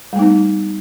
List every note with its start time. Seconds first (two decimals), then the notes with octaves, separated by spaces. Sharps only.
0.13 G3
0.16 A3
0.19 D#4
0.22 B3